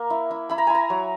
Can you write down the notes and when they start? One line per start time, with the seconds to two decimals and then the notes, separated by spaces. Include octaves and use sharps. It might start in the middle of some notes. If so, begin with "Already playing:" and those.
Already playing: A#3 A#5
0.10 E4
0.31 E4
0.50 E4 B5
0.58 A#5
0.67 E4 G#5
0.75 A#5
0.90 F#3